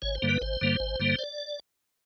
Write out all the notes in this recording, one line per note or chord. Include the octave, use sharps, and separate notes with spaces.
G#1 C#5
C5
G2 D3 G3 A#3
B4
G#1 C5
G2 D3 G3 A#3
G#1
G2 D3 G3 A#3
D5